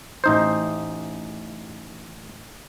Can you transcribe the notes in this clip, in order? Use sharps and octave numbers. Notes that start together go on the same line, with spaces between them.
A1 D#4 C5